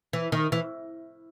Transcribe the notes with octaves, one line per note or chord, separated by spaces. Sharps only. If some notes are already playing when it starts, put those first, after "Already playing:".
E3
D#3
E3